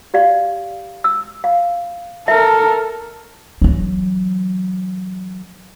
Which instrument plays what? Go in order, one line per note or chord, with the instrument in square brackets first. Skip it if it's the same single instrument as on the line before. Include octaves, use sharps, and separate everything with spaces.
[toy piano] G4 D5 F5
E6
F5
[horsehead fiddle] A4 A#4 [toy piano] E5
[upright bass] E3 F#3